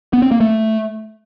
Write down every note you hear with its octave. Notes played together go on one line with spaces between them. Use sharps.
B3
C4
A#3
A3